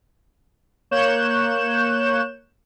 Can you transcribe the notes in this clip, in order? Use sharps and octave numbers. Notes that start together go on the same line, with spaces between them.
A#3 C#5 C#6 F#6 G6 E7